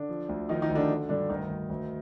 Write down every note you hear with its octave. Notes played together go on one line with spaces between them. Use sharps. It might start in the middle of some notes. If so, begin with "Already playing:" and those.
Already playing: D3 D4
F3
D2
D#3 F3 D#4
D#3 D#4
D2
D3 D4
D3
G2 D3 D4
D2 D#3 D#4
D2
D2